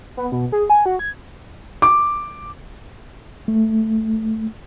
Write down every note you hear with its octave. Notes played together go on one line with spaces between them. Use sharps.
B3
B2
G#4
G#5
F#4
G#6
D6
A3